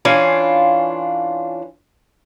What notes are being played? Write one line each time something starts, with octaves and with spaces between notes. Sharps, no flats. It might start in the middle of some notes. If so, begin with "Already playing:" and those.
E3 C#4 D4 F4